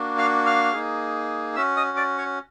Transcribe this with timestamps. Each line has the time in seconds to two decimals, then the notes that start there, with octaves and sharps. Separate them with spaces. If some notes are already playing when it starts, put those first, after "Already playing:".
Already playing: A#3 D4 F#4
0.18 F5 F6
0.46 F5 F6
0.73 A#3 D#4 G#4
1.56 C#4 F#4 E5 E6
1.76 D#5 D#6
1.97 D5 D6
2.18 C#5 C#6